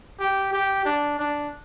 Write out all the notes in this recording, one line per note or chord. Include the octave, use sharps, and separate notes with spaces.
G4
G4
D4
D4